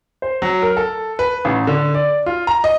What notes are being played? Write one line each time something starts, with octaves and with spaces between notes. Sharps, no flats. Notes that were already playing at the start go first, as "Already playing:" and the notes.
C5
F#3
A#4
A4
B4
A1
D3
D5
F4
A#5
D#5